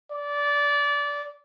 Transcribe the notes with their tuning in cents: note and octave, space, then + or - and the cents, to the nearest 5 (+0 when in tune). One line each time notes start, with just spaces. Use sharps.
D5 -20